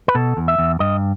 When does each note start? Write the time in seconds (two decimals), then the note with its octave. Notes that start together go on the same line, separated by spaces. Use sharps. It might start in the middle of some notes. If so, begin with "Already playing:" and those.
0.08 B4
0.15 B2 A4
0.37 E2
0.48 E5
0.58 E2
0.80 G2 D#5